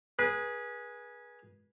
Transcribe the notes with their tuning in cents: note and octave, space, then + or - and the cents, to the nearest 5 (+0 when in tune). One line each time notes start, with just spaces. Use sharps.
G#4 +0 B4 -30